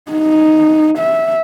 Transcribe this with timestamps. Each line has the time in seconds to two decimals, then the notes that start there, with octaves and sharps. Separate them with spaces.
0.11 D#4
0.98 E5